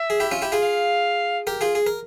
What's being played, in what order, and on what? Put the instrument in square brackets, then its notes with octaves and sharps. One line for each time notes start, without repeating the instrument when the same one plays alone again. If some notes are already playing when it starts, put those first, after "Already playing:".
Already playing: [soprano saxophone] E5
[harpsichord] G#4
E4 G4
C#4 F4
E4 G4
F4 G#4
[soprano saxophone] F5
[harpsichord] G4 A#4
F4 G#4
G#4
A#4